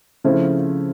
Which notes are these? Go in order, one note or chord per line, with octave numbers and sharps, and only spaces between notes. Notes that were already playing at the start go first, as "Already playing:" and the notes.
C#3 F3 A3 C4 E4